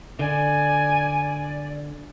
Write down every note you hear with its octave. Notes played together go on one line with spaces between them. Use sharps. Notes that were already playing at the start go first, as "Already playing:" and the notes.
D3 D5 G#5